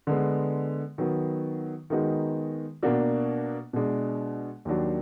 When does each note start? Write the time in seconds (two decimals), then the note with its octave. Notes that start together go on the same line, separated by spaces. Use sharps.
0.07 D3 G#3 B3
0.98 D#3 F#3 B3
1.90 D#3 G#3 B3 D#4 F#4
2.83 B2 A#3 D4 F#4
3.73 B2 G#3 D4
4.65 D#2 D#3 F#3 D4